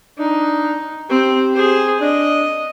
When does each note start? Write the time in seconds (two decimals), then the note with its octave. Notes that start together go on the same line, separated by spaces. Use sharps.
0.18 D4 D#4
1.10 C4 G4
1.52 G#4 C5
2.01 D4 D#5